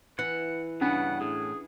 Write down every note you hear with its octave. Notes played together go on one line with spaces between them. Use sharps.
E3 F#5
G2 C#3 B3 C#4 D4 F#5
A2 G#4